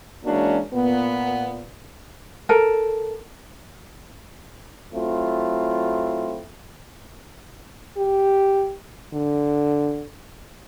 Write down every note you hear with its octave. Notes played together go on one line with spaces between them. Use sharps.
E3 G#3 A#3 C#4 D4 F#4
A#2 B3
A4 A#4
F#3 A3 C4 E4 F4
G4
D3